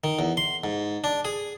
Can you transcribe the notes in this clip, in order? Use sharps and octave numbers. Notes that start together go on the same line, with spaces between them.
D#3
E2
C6
G#2
D4
G#4